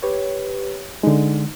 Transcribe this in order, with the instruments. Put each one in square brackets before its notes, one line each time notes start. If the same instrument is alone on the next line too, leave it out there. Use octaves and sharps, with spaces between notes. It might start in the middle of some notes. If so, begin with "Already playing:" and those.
[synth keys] G4 B4 C#5
[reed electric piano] D3 G#3 [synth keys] D#4